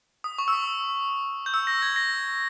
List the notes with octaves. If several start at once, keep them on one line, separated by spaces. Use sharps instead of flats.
D#6
C#6
E6
D#6
G6
E6
A#6
G#6
A#6